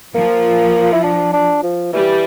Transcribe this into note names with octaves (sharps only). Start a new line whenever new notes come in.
F3 A#3
E4
D4
D4
F3
E3 G3